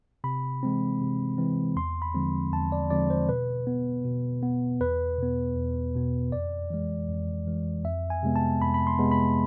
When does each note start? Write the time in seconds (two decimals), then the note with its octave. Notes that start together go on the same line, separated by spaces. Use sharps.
0.24 C3 B5
0.63 E3 G#3 C4
1.01 C3
1.38 E3 G#3 C4
1.76 E2 C6
2.02 B5
2.15 D3 F3 G#3 C4
2.52 E2 A5
2.72 D5
2.90 D3 F3 G#3 C4 D5
3.10 C5
3.29 B2 B4
3.67 B3
4.05 B2
4.43 B3
4.81 E2 B4
5.18 B2 B3
5.56 E2
5.95 B2 B3
6.32 F2 D5
6.70 E3 G#3
7.09 F2
7.47 E3 G#3
7.84 F2 E5
8.10 G#5
8.23 C3 G#3 B3
8.36 A5
8.61 F2 B5
8.74 B5
8.87 C6
8.99 C3 G#3 B3
9.12 B5